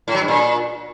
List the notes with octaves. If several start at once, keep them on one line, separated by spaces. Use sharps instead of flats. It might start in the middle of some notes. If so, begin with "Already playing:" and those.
A2
F#3
G2
A#2